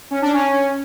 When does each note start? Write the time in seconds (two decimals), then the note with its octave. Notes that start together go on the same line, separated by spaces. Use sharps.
0.11 C#4
0.22 D4
0.33 C#4